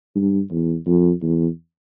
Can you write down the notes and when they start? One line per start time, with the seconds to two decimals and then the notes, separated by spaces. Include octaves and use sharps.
0.15 G2
0.51 E2
0.87 F2
1.23 E2